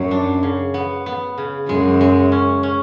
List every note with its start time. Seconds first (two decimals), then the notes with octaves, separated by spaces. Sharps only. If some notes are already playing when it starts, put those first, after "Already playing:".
Already playing: F#2 F#3
0.11 D4
0.43 C#3
0.74 B3
1.06 B3
1.38 C#3
1.69 F#2 G#3
2.01 G#3
2.32 C#4
2.63 C#4